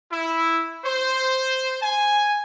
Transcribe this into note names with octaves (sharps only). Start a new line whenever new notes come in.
E4
C5
G#5